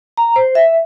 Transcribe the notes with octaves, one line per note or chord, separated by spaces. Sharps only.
A#5
C5
E5